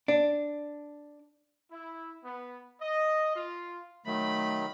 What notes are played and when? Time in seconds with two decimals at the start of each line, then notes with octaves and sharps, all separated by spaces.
0.08 D4
1.72 E4
2.24 B3
2.81 D#5
3.36 F4
4.06 D#3 F#3 A3 B5